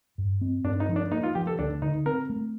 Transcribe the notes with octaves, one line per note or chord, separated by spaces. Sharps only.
G2
C4
G2 D4
D#4
F3
D4
A#3 D#4
F4
F3 G4
A4
D2 D4
D3 D#4
C4 A#4
A3